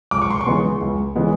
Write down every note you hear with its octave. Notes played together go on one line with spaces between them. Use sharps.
C#2 D6
C#6
C6
C#6
C#3 E3 G#3 B3
C#2
C#3 E3 G#3 B3